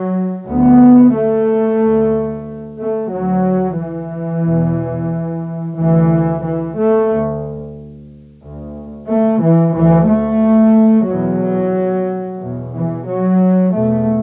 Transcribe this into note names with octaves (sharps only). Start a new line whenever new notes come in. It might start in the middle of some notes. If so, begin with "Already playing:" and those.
Already playing: F#3
D2 B3
A3
D2
A3
D2 F#3
E3
E2 B2
D2 E3
E3
A3
D2
D2
A3
E3
D2 E3
A3
E2 B2 F#3
E2 B2
E3
F#3
E2 B2 A3